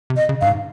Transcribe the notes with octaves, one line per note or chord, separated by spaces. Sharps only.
C3
D#5
C#3
G2 F5
G#2